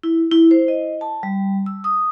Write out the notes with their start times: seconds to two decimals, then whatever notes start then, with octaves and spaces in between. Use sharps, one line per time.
0.03 E4
0.31 E4
0.51 C5
0.68 D#5
1.01 A5
1.23 G3
1.66 E6
1.84 D#6